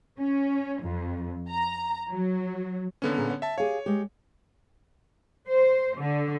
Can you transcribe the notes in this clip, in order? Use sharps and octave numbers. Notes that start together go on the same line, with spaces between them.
C#4
F2
A#5
F#3
D#2 D3 B3 C#4 A4
A#2 G#4 A#5
C#5 F#5
E5 A5
G4 G#4 C#5 F5
G#3 G4
C5
D3